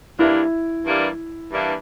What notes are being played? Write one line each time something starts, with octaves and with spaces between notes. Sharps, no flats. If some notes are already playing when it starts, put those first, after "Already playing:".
G2 E3 G3 A#3 D4 E4
G2 E3 G3 A#3 D4
G2 E3 G3 A#3 D4